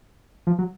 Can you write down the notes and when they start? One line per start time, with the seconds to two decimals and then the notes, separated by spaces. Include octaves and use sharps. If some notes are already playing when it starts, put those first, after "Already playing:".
0.47 F3
0.59 F#3